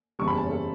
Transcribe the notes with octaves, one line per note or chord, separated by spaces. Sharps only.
F#1 E2 D3 G3 C#6
B5
A5
C#5
A4